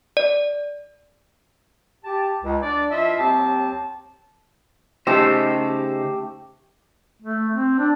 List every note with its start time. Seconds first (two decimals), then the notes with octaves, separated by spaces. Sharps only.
0.17 D5
2.04 G4 A5
2.44 C#2
2.62 D4 D5
2.91 F3 E4 F4 D#5 E5
3.19 D#2 F#3 C4 G4 A5
5.07 C#3 A3 D#4 G4 C5 E6
7.22 A3
7.54 C4
7.79 D4